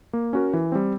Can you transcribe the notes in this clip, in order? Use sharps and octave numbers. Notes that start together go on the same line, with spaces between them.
A#3
C#4 F#4 A#4
E3
G3 C4